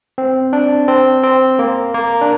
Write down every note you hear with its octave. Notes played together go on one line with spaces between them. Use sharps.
C4
D4
C4
C4
A#3
A#3
D4